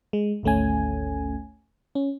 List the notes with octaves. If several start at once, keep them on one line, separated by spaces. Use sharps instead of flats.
G#3
G#1 D2 A3 C#4 G#5
C#4